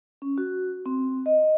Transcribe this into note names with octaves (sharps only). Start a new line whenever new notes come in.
C#4
F#4
C4
D#5